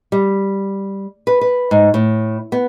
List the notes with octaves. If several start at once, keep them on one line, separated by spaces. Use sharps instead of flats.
G3
B4
B4
G#2
A2
B3